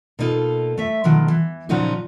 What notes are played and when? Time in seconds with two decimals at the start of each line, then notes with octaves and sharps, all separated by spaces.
0.19 B2 A#3 D#4 F4 A4
0.78 A3 E5
1.04 B2 D#3 F3 F#3 A3
1.28 E3
1.69 A#2 C#3 F3 F#3 D#4 F#4